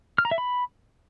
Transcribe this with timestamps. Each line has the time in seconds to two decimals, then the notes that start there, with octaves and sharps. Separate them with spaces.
0.18 F6
0.25 A#5
0.31 E5
0.38 B5